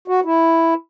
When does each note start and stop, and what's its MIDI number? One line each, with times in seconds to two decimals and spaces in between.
0.08 0.20 66
0.25 0.74 64